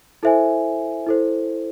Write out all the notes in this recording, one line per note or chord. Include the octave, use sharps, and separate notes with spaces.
E4 A4 C5 E5 G#5
E4 A4 C5